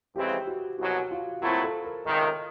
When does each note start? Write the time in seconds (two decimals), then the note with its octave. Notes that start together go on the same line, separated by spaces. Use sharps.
0.16 F2 C#3 E3 G#3 C4 G4
0.47 F#4
0.79 C2 B2 F#3 F#4
1.11 F4
1.42 A#2 F#3 A3 C4 E4 F4
1.63 A4
1.84 A#4
2.05 C#2 C3 D#3 D#5